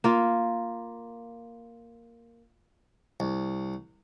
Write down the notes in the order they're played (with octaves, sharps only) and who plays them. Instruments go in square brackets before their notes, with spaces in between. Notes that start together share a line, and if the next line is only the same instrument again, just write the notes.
[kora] A#3 F4
[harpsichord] C2